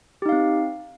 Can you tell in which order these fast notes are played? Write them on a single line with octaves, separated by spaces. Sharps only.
G4 D#4 F5 C4